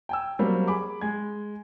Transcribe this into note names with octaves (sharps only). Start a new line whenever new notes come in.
G5 G#5 E6
F#3 G3 A#3 C4
G#4 B5 D6
G#3 G#6